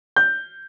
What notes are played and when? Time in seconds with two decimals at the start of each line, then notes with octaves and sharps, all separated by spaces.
0.16 G6